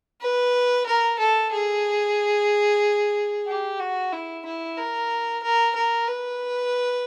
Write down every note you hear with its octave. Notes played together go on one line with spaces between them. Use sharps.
B4
A#4
A4
G#4
G4
F#4
E4
E4
A#4
A#4
A#4
B4